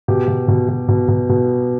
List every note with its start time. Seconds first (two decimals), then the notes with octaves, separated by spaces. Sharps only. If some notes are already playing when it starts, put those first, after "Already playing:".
0.08 B2 G4
0.28 B2
0.48 B2
0.68 B2
0.88 B2
1.08 B2
1.29 B2